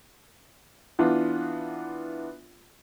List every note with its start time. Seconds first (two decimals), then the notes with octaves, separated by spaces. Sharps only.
0.99 E3 B3 D4 F4